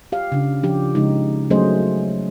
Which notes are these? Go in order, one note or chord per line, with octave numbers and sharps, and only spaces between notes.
G4 F5
C#3 D4
F3 D4 G4
C#3 G#3 D#4
F#3 A3 C#4 G#4 C5 D#5